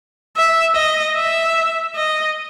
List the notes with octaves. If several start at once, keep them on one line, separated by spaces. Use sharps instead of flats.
E5
D#5
E5
D#5